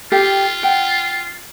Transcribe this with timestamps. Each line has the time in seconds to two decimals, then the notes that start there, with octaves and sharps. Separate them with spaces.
0.12 F4 G4 A4 G5
0.63 F#5 G5